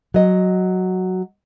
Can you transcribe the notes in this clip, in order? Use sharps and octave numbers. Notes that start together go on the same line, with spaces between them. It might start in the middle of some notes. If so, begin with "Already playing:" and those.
F#3 D#5